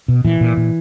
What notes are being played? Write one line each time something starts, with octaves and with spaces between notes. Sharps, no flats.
B2
A#2 E3
A#2
A#2